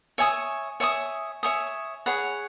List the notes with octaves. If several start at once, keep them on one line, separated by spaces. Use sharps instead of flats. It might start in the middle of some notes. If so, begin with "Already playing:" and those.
C#5 E5 G#5 D#6
C#5 E5 G#5 D#6
C#5 E5 G#5 D#6
G#4 C#5 F#5 B5